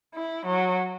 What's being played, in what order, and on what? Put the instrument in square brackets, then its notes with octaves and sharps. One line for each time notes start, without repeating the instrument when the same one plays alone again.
[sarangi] E4
F#3